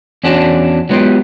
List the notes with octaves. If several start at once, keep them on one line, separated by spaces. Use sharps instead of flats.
E2 C#4 D4 F#4 A5
F#3 G#3 B3 E4 F4 G4